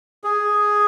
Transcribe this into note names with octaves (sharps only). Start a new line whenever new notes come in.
G#4